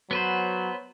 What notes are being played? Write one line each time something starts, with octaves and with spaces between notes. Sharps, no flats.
F#3 B3 B4 C5